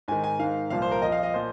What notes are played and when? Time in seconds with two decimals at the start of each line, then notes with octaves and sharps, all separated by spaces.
0.08 G#2 D#3 G#5
0.24 G#5
0.39 G#2 D#3 F5
0.70 C2 A#2 F3 F5
0.82 C5
0.91 A#4
1.02 F2 F3 D#5
1.12 F5
1.23 D#5
1.34 A#2 F3 C5